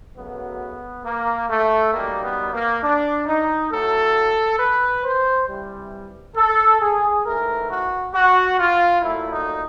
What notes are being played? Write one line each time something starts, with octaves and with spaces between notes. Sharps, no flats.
F#2 C#3 F#3 A3 B3
A#3
A3
F#2 D#3 G3 A#3
B3
A#3
D4
D#4
A2 F#3 A3 A4
B4
C5
C3 E3 G3
A4
G#4
G#2 E3 A3 A#4
F#4
F#4
F4
A#2 F#3 A3 E4
D#4